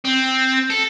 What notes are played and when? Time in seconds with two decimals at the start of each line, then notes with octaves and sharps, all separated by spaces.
0.05 C4
0.70 A4